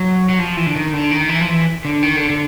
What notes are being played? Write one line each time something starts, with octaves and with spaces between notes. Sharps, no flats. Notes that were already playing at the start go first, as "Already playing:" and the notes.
Already playing: F#3
F#3
F3
E3
D3
D#3
D3
D#3
E3
F3
E3
D3
D#3
D3
D3